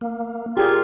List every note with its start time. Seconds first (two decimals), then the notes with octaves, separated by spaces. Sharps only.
0.01 A#3
0.57 A#2 F4 G4 G#4 G#6